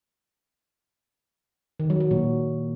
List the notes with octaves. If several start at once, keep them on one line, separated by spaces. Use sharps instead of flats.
D#3
F#3
F#3
A#2